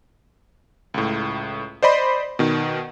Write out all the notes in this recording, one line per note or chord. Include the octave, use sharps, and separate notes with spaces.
C#2 A2
C5 D5 D#5 B5 C6
B2 D#3